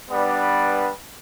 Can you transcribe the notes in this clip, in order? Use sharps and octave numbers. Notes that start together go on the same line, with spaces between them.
G3 B3 D4 B4 D5